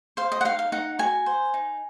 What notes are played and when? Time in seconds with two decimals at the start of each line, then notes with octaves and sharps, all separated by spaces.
0.17 C5 F5
0.32 D#5
0.41 F#5
0.45 D#4 F5
0.59 F5
0.72 D#4 F#5
0.99 F#4 G#5
1.26 C5
1.54 D#4